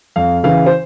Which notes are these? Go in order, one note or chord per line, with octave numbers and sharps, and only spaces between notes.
F2 F5
C#3 E3 F5
C5